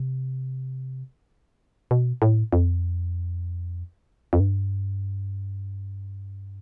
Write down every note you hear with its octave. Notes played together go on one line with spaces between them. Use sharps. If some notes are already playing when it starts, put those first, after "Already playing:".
Already playing: C3
B2
A2
F2
F2
G2